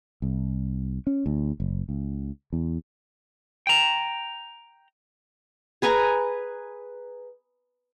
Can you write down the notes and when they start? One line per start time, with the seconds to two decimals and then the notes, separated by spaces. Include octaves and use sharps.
0.22 C2
1.07 C#4
1.26 D2
1.60 F#1
1.89 C#2
2.53 E2
3.67 G5 A#5
5.82 G#4 B4 G#5 A#5